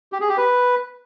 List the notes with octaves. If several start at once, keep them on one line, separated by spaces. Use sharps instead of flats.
G4
G#4
G4
B4